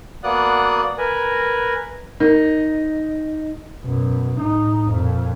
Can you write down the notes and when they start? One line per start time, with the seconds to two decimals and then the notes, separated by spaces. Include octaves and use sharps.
0.24 A#3 B3 F#4 D5 D#6 F#6
0.98 A#4 B4 G#5
2.20 D#4 A#4
3.83 F#2 B2
4.38 A2 D#4
4.90 F2 A#2